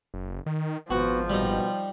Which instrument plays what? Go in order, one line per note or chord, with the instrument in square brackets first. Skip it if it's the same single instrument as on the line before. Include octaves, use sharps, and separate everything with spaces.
[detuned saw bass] F#1
D#3
[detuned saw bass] G#1 [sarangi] F3 [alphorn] B3 [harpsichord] F#4
[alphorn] B2 [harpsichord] G3 D#4